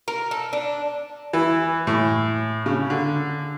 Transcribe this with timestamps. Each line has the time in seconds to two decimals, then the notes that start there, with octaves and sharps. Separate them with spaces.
0.08 A#4
0.31 A4
0.53 D4
1.33 E3
1.87 A2
2.66 C#3
2.90 D3